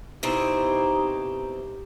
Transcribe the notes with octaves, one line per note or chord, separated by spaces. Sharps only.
B2 C4 D#4 E4 G4